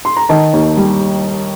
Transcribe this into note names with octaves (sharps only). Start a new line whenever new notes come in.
C6
A#5
D#3 A5
D#2
G3